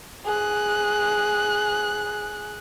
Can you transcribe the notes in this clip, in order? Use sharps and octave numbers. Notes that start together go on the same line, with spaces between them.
G#4 F#6